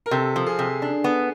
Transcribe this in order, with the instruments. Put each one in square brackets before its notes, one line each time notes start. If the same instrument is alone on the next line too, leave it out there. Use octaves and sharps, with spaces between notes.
[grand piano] A#4
[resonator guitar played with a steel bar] C3 [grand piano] A4
[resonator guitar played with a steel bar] F3
[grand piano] G#4
[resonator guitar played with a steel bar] C3
D4
B3